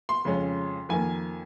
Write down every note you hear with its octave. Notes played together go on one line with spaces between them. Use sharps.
C6
F2 C#3 G#3 C#4
F2 D#3 A#3 G#5